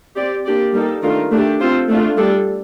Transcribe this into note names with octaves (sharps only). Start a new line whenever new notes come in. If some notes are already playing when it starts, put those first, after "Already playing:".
C4 G4 D5
A#3 D4 G4 D5
G3 A#3 D#4 A4
D#3 A3 D4 F4 A#4
A3 D4 G4
C4 F4 A4 C5
A3 D4 F4
G3 D4 A4